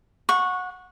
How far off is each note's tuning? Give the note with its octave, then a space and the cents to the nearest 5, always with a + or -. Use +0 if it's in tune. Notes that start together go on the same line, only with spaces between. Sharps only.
F#5 -20 C#6 -10